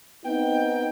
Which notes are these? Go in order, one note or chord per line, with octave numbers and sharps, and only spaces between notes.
B3 C4 D#4 G5